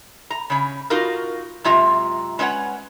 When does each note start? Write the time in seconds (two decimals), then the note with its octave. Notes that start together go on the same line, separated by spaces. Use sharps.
0.30 A#5
0.50 C#3 C#4
0.90 D#4 F4 F#4 A#4
1.64 F#2 C3 G#3 F4 E5 A#5
2.39 G#3 C#4 B4 C#5 F#5